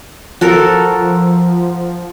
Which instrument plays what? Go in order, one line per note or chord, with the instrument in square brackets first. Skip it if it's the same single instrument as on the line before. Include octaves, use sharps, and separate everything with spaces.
[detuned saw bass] F3 [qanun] F#4 A4 A#4